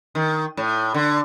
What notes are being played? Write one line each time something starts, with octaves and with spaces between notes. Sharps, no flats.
D#3
A2
D3